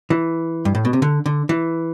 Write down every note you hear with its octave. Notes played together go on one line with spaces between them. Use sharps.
E3
G2
A2
B2
C3
D3
D3
E3